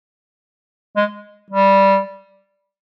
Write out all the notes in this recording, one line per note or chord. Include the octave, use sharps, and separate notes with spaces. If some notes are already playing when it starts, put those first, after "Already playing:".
G#3
G3